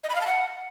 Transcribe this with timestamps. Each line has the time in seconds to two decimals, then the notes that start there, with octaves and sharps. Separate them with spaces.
0.04 D#5
0.10 B5
0.15 F5
0.21 A5
0.27 F#5